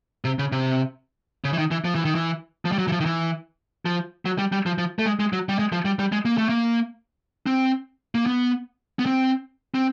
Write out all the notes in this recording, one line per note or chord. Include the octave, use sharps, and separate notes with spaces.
C3
C#3
C3
C#3
E3
D#3
E3
F3
E3
D#3
E3
F3
G3
F#3
E3
F3
D#3
E3
F3
F#3
G3
G3
F3
F3
A3
G#3
G#3
F#3
G3
G#3
F3
G3
G3
G#3
A#3
A3
A#3
C4
A#3
B3
B3
C4
C4